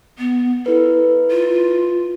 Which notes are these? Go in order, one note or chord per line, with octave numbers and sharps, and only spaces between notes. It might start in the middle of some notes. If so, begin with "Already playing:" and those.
B3
E4 A4 B4
F4